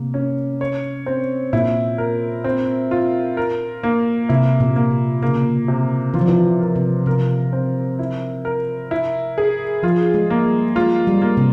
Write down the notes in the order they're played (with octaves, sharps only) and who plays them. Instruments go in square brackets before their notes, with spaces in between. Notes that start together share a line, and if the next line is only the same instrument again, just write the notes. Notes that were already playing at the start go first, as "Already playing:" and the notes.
Already playing: [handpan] C3 [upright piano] A#3
[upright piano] C#4
C#5
C4
[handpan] A#2 [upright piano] E4
[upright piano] A#4
C4
F4
A#4
A#3
[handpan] C3 [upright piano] E4
[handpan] A#2
[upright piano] A#3
[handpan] C3
[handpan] C#3 [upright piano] A#3
[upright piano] C3
[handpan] E3 [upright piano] F4
[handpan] F3
E3
[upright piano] A#4
[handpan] C3
[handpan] C3 [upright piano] A#4
[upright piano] C4
E4
A#4
E4
G#4
[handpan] F3 [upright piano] F4
[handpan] G#3
[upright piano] A#3
[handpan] G3
[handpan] G#3 [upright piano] F4
[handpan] G3
[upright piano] A#3
[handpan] C3